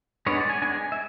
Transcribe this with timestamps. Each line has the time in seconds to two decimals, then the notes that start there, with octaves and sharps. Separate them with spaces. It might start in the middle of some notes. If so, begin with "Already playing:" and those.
0.26 G#3 B3 D4 C#5
0.38 D5
0.50 G#5
0.62 G#3 B3 D4 G#5
0.92 E5